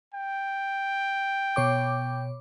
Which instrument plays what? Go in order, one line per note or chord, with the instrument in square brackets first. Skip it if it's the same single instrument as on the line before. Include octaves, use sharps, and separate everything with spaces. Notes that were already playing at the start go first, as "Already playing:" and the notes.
[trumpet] G5
[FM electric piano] B2 C#5 D6